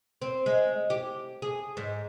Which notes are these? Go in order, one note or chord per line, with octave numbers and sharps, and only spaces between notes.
C4
G#3
G4
G#4
G#2